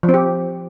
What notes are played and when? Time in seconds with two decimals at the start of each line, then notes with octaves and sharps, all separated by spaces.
0.03 F3
0.09 C4
0.14 G4